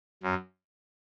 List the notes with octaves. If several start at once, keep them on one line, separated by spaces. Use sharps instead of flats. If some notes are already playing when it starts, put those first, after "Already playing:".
F#2